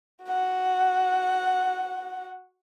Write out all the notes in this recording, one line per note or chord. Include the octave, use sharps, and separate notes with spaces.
F#4 F#5